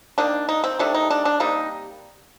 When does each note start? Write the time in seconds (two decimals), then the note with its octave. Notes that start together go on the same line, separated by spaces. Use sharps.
0.18 D#3 A#3 D4
0.49 D#4
0.64 C4
0.79 C3 D#3 A3 D4
0.94 D#4
1.10 D4
1.25 D4
1.40 C3 G3 A#3 D#4